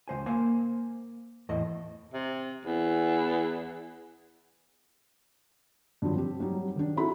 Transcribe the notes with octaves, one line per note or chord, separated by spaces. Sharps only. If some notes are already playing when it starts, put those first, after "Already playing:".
C#2 C#3 C5 G#5
A#3 C5 F5 G#5
E2 A2 D#5
C3
E2
G2 D3 D#3 F3 F#3
C4 G4
F#3 G3 D#4
D#3 D4
C4 D#4 E4 F#4 A4 B5